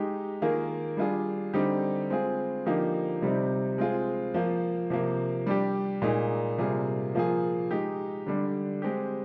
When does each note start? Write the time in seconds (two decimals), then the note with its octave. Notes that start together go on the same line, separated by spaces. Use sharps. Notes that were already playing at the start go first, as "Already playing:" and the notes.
Already playing: G#3 D#4 G4
0.42 D#3 A#3 F4 G#4
0.97 G3 D4 F4 G#4
1.54 D3 G3 C4 D#4 G4
2.10 G#3 C4 F4 G#4
2.66 D3 F3 A#3 D#4 G4
3.22 C3 G3 C4 D#4
3.78 G#3 C4 F4 G#4
4.34 F3 A#3 F4
4.90 C3 F3 A#3
5.47 G3 D4 G4
6.02 A#2 G#3 D#4 G#4
6.58 C3 G3 A#3 F4 G#4
7.15 F3 A#3 F4 G#4
7.71 G#3 D#4 G4
8.26 D3 G3 D4
8.82 G#3 C4 G4